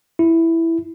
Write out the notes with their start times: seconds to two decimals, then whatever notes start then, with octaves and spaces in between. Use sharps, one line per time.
0.19 E4